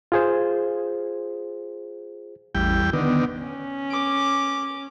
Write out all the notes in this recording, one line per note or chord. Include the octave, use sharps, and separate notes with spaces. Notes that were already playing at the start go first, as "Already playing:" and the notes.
F4 G#4 C5
A1 E2 G3 G5
D3 D#3 B3
C#4
D6